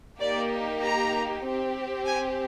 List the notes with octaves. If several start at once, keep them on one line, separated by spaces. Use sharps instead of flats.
A#3 D#4 G4 D5
A#5
C4 G4
G#5